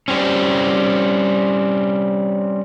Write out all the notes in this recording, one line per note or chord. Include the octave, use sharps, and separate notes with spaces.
G3 C4 C#4